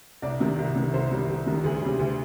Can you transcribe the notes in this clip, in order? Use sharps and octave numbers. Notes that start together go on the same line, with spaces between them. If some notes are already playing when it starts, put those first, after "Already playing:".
C2 D5
C3 D#3
C2
C3 D#3
C2 C5
C3 D#3 G3
C2
C3 D#3 G3
D2 G#4
C3 G3
D2